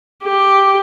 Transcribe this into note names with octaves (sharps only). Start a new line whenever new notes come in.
G4